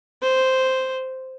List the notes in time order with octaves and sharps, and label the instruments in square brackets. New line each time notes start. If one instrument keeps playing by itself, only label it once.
[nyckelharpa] C5